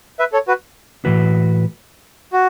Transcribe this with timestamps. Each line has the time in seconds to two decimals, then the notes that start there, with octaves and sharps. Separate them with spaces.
0.19 B4 E5
0.32 A4 C#5
0.48 F#4 B4
1.05 A2 E3 A3 F#4 B4
2.33 F#4